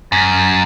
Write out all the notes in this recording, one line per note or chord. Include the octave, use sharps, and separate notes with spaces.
F#2